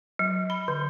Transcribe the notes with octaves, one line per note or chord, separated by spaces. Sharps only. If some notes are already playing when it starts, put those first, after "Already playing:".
F#3
B5
D3